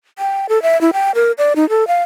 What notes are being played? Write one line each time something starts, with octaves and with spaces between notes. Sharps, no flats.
G5
A4
E5
E4
G5
A#4
D5
D#4
A4
F5